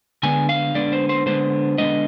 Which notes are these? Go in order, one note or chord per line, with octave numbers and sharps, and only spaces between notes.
D3 G#3 B3 D4 G#5
F5
D3 G#3 B3 D4 D5
C5
C5
D3 G#3 B3 D4 C5
D3 G#3 B3 D4 D#5